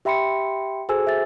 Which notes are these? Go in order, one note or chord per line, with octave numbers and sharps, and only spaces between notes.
G4 E5 G5 B5 C6 C#7
F#4 G#4 A4 C5 G#5 E6
E5 A6